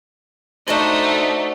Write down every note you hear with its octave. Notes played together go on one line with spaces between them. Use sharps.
A3 D4 D#4 F#4 C5